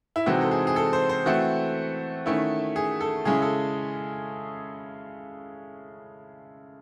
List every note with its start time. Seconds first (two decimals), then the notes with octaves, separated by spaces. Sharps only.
0.16 E4
0.26 C3 E3 G#3 C4 D#4 F#4
0.41 A4
0.51 G#4
0.67 G#4
0.76 A4
0.93 C5
1.09 C5
1.26 E3 A3 C4 F#4
2.26 D#3 A3 C#4 E4
2.76 G#4
3.01 A4
3.25 C#3 G#3 C#4 E4 G#4
3.42 A4